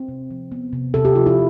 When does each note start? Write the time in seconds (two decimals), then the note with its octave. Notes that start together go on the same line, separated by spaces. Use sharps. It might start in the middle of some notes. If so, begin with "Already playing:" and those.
Already playing: C4
0.09 C3
0.31 F3
0.52 B3
0.73 C3
0.94 C3 A4
1.05 G4
1.15 F3 F4
1.26 E4